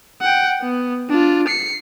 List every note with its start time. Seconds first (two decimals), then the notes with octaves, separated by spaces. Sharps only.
0.21 F#5 G5
0.62 B3
1.09 D4 F4
1.48 C7 C#7